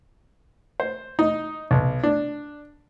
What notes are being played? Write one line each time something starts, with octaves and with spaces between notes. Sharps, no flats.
C5
D#4
B1
D4